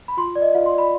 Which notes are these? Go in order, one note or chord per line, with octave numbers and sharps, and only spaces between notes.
B5
F4 C6
D5
D#5
F4 F5
C6
D5
B5